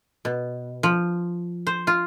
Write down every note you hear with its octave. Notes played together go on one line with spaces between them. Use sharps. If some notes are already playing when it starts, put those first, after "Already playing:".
B2
F3
C5
F4